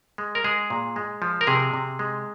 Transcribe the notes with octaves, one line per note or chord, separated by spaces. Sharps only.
G#3
A#4
G#3 G#4
A#2
G#3
F3
A#4
C3 G#4
C3
G#3